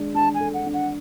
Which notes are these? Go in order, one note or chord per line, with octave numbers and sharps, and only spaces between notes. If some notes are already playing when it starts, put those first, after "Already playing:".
Already playing: G#3 D4
D4 A5
G#5
A4
F#5
D4
F#5